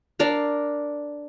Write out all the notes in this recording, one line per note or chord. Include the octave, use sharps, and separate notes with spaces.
D4 A#4 F5